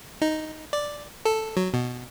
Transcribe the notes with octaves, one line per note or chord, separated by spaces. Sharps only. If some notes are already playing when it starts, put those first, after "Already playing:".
D#4
D5
A4
F#3
B2